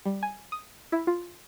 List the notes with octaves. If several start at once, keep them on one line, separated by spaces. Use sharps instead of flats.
G3
G#5
D#6
E4
F4